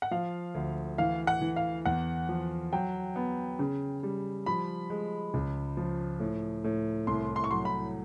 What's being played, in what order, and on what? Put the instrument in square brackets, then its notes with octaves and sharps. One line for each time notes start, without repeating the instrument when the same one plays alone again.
[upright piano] F#5
[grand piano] F3 [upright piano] F5
[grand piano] D2
[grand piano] E3 [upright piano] F5
[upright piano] F#5
[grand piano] E3
[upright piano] F5
[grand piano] E2 [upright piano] F#5
[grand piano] F3
[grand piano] F#3 [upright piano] G5
[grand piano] B3
C#3
G3
[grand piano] F3 [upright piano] B5
[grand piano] G#3
C#2
F3
A2
A2
[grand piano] C2 [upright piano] C6
[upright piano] C6
C#6
[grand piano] F#3 [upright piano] C6
[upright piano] B5